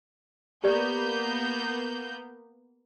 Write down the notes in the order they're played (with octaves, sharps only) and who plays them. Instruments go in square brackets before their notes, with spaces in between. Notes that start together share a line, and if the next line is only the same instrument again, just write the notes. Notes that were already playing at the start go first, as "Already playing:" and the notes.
[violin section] A#3 B3 G6 [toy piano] G4 D5